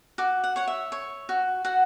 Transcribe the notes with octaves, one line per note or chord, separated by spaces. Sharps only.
F#4 D6
F#5
C#5 F#5
E5
C#5
F#4
F#4 F#5